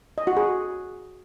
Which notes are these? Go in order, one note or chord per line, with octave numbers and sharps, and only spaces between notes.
D#5
F#4
G#4